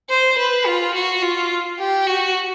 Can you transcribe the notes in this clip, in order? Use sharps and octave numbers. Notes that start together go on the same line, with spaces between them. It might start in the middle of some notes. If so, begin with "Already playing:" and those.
C5
B4
F4
F#4
F4
G4
F#4